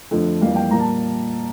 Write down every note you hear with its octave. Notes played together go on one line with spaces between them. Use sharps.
F2 D3 F3 A3
F2 E3 G3 A#3 F5
G5
A#2 G3 A#3 A#5
A5